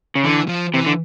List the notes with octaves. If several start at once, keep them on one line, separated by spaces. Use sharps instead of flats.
C#3
D3 E3
F3
C3 E3
D3